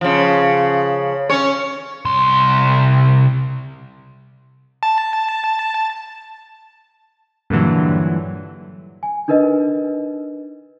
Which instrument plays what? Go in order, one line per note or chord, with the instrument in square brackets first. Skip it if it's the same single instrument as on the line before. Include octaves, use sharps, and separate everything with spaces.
[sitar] C#3 F3
C#4 C#5
[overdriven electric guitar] C2 C6
[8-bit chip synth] A5
[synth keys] G2 A#2 D3 E3 F#3
[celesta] G#5
D4 D#4 A#4 B4 D#5